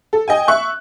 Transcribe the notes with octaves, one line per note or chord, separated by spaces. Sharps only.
A4
D#5 G5 G#5
E5 C#6 F#6